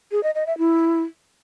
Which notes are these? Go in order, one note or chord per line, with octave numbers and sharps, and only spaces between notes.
G#4
D#5
D#5
E5
E4